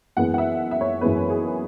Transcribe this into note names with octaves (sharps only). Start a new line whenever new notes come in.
F#2 E3 G#3 B3 F#5
F#5
E5
E5
C#5
F#2 E3 G#3 B3 B4
G#4